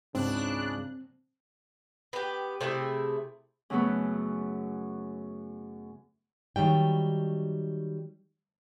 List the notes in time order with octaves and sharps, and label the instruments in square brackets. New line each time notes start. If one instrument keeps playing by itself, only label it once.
[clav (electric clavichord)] C#2 G#2 [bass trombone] C#3 [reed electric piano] C4 [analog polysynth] D4 F#6
[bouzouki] B3 G4
C3 A3 E4 G#4
[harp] F#2 C#3 F#3 A3 B3
[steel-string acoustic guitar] D#3 F#3 G3 G5